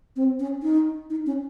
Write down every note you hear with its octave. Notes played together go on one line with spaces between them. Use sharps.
C4
C#4
D#4
D#4
C#4